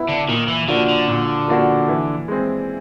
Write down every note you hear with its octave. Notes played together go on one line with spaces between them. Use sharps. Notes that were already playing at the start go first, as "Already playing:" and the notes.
Already playing: B3 E4
D3
A#2 D#3
E3
D3 F3 A#3 D4 F#4
D3
A#2
F3 A#3 D4 F#4
E3
G#3 C4